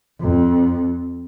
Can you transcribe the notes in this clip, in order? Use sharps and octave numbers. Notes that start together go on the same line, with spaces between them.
F2